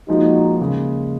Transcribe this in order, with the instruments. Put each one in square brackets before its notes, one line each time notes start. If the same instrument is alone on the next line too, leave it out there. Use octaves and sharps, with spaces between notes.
[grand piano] A#2 F3 G#3 [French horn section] D#4 F#4
[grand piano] D#2 C#3 G#3